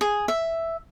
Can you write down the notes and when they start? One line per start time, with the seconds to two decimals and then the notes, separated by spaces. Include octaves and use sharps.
0.01 G#4
0.28 E5